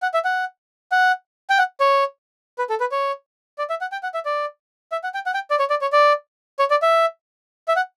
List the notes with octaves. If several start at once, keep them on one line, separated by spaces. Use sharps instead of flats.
F#5
E5
F#5
F#5
G5
F#5
C#5
B4
A4
B4
C#5
D5
E5
F#5
G5
F#5
E5
D5
E5
F#5
G5
F#5
G5
D5
C#5
D5
C#5
D5
C#5
D5
E5
E5
F#5